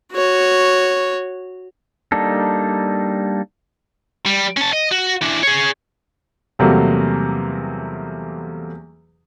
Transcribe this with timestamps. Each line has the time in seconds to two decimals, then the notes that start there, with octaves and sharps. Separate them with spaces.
0.13 F#4 C#5
2.12 G3 A#3 D4 D#4 A4
4.26 G3
4.57 C#4 A5
4.72 D#5
4.91 F#4
5.22 E3 D4
5.43 G#4 C#5
6.59 E2 C3 F#3 G3 A3 A#3